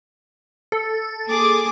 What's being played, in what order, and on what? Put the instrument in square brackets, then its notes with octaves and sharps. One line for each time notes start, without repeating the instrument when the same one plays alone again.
[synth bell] A4
[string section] A#3 G#4 D6